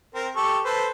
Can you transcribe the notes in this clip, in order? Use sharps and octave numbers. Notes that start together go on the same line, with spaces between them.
C4 A#4
G4 A4 C#6
A4 B4 C5